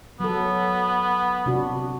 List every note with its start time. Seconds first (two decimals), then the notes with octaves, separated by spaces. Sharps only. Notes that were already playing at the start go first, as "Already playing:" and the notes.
0.20 F#3 B3 A4
1.46 C3 D4 F#4